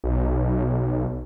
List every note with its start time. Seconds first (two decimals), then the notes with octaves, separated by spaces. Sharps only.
0.04 B1